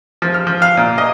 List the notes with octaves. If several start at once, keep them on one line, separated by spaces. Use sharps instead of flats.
F3
F6
F3
F5
A#2
D#5